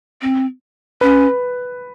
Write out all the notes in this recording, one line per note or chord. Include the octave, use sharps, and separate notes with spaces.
C4
C#4 B4